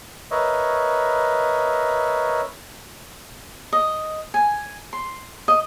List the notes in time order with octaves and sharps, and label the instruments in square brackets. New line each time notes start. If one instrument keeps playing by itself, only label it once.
[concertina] A#4 B4 C#5 D#5 E5
[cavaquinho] D#5
G#5
C6
D#5